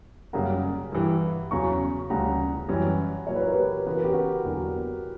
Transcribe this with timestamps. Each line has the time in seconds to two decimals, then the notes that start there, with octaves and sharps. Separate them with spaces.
0.33 F#2 C#3 G3 A#3 F#5 A#5
0.92 G2 E3 G3
1.51 E2 C#3 F#3 A#5 C#6
2.10 D2 C#3 G3 F#5 A#5
2.68 F#2 E3 G3 C#4
3.27 A#2 F#3 A#3 E4 C#5
3.36 B4
3.44 A#4
3.53 G4 B4
3.87 C#3 E3 B3 F#4 B4
3.95 A#4
4.04 G4
4.13 F#4 A#4
4.45 E2 D3 F#3 A#3